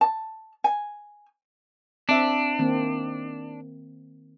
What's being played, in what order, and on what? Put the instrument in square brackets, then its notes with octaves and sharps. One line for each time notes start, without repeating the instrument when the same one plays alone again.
[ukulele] A5
G#5
[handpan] C4 E5 [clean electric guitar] D4
[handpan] D#3 A#3 C4